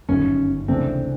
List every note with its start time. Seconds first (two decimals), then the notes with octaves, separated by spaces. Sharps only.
0.09 G1 F#2 D#3 C#4
0.68 C#2 C3 E3 A3 C4 D4